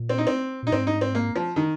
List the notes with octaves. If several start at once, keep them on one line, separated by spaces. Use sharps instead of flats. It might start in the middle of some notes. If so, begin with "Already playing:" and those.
Already playing: A#2
C4
D#4
C4
A#2 D#4
G#2 C4
D#4
C4
A#3
F3
D#3